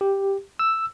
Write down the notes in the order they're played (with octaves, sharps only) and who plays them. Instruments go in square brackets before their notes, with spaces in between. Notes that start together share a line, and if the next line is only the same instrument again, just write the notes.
[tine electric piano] G4
E6